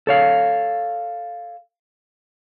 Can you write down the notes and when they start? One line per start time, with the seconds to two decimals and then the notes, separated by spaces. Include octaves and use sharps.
0.07 A4 C#5 F5